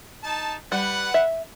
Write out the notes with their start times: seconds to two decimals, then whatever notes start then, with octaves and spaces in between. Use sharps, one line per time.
0.24 D#4 A5
0.72 G3 B4 F#5
1.14 E5